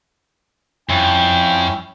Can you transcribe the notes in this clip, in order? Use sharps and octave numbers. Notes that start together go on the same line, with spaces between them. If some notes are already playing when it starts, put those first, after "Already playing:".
F2 C#4 E4 G5